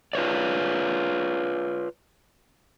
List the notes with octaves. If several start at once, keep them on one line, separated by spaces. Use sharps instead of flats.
F4 B4 C#5 D5